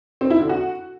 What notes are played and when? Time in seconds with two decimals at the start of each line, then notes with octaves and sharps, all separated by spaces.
0.21 C4
0.30 E4
0.40 D3
0.49 F#4